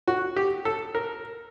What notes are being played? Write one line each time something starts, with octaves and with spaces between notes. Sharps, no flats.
F#4
G4
A4
A#4